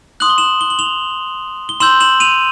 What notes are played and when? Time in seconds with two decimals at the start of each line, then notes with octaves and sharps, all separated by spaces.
0.20 C6 D#6 F#6 F#7
0.30 G7
0.38 E7 F#7
0.61 G7
0.70 F#7
0.79 F7 G7
1.69 G7
1.80 C6 E6 G6 E7 F#7
2.00 E7 F#7
2.20 D#7 F7